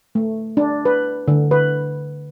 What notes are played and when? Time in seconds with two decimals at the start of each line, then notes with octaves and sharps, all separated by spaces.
0.15 A3
0.57 D4
0.85 B4
1.28 D3
1.51 B4